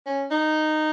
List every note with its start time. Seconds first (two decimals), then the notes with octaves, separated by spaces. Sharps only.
0.06 C#4
0.31 D#4